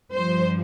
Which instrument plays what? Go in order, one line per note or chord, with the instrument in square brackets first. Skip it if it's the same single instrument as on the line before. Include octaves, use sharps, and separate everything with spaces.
[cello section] G2 F3 C5